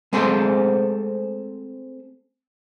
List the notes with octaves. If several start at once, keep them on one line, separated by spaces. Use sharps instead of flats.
G#3 A3 C4 G#4 A4 C5